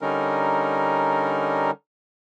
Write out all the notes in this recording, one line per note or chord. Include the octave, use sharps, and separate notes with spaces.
D3 G3 C#4 D#4 A#4